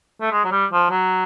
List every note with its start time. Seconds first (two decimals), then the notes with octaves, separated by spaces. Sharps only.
0.21 A3
0.32 G#3
0.44 F#3
0.52 G3
0.72 F3
0.91 F#3